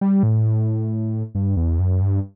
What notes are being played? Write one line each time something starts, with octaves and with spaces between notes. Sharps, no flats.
G3
A2
G2
E2
F#2
G2